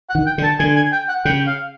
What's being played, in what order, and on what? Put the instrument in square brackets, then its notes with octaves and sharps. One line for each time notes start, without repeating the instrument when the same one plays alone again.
[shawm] F#5
[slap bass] D#3
[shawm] G5
[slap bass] D3
[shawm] A5
[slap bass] D3 [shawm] G#5
[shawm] G#5
G5
F#5
[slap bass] C#3 [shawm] G5
[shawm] F5